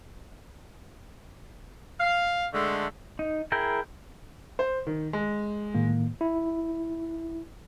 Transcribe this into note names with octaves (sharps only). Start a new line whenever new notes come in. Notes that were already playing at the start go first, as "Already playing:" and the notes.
F5
D3 G#3 A3
D#4
E4 G#4 A#4 G5
C5
D#3
G#3
A2 D#3 A#3
E4